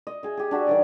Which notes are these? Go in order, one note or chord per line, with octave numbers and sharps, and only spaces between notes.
D#5
G#4 E5
G4 G#4
D4 F#4 G#4 E5
D#3 F#3 D5